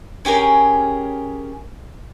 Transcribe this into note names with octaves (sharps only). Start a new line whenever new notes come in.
C#4 G4 G#4 A#4